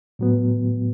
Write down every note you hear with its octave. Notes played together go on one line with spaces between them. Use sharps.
A2 F#3 B3